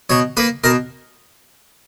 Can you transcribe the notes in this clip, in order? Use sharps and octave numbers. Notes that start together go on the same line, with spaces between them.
B2 C#5
A#3 B4
B2 A#4